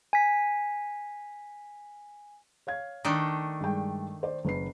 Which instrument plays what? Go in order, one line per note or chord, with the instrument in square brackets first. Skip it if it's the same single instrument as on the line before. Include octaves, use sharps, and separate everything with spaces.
[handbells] G#5 B6
[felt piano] C#5 F5 G#6
[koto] D#3 A3 D4
[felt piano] G2 G#3 G5
C5 D5
F#1 B4 C7